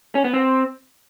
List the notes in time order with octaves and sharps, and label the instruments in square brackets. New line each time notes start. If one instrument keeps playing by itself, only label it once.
[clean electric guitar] C#4
B3
C4